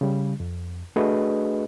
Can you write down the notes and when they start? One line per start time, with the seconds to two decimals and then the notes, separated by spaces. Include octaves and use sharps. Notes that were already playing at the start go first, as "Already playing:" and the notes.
0.01 C#3 G3
0.40 F2
0.96 A3 D4 F#4 G#4 B4 D#5